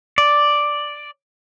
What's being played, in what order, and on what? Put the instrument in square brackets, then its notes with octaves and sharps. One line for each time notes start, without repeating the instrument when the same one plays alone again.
[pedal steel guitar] D5